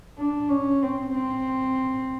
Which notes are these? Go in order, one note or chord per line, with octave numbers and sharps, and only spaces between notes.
D4
C#4
C4
C4